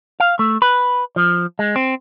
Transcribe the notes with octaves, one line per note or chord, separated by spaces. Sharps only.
F5
A3
B4
F3
G#3
C4